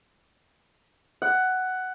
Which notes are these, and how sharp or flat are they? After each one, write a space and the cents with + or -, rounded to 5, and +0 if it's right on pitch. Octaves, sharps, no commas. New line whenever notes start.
F#5 +10